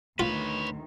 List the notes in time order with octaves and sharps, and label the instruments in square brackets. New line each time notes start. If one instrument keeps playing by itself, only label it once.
[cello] D2 D#3 [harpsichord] F4 [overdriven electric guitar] B4 C#5